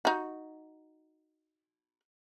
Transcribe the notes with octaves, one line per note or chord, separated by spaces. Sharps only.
D#4 F#4